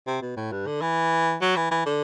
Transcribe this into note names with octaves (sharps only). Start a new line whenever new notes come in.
C3
B2
A2
G2
D3
E3
F#3
E3
E3
D3